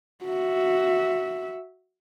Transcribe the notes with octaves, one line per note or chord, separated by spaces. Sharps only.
F#4 E5